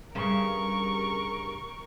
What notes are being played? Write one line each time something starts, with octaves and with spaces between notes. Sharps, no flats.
G2 C#3 A#4 C#6